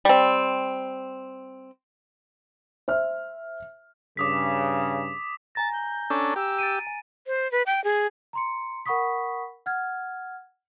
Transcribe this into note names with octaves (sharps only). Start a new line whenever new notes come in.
G3 C4
C5 E5 F6
G2 C#3 D6 D#6 B6
G#5 A#5 A6 A#6
G6
C#4 D4 A4
G4 E6
A6 D7 D#7
G#5
C5
B4
G5
G#4
A#5 C6 C#7
A#4 F#5 B5 C#6 D#6 B6
F#5 F6 G#6